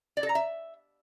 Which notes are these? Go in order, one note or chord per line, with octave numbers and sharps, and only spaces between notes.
D5
A4
A#5
E5